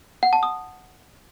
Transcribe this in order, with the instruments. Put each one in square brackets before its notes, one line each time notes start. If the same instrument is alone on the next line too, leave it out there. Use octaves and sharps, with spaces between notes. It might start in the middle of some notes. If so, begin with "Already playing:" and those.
[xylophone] F#5
A5
D#6